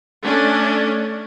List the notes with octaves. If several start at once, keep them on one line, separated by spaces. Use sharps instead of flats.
A3 C#4 D4